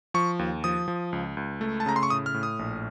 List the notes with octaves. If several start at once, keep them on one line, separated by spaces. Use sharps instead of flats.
F3 C#6
D#2
F3 D#6
F3
C#2
C#2
A3
A5
C#3 A#5
C6
C#6
A2 D#6
F6
A2
D#6
A#1